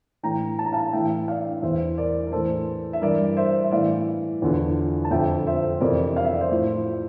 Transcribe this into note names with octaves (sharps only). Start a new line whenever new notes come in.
A2 E3 G5 A#5
A5
A#5
F5 A5
A2 E3 E5 G5
D5 F5
E2 E3 C5 E5
A#4 D5
A#4
A2 E3 A4 C5
E5
G2 E3 A#4 D5
C5 E5
E5
A2 E3 D5 F5
E2 D3 F3
A5
F2 D3 F3 E5 G5
C5 E5
F2 C3 E3 A#4 D5
F5
E5
D5
C5 E5
A2 F3